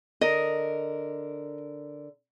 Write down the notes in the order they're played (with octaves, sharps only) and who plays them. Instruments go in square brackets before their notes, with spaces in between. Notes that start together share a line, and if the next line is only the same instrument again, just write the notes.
[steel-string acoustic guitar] D3 A#4 [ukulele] D#5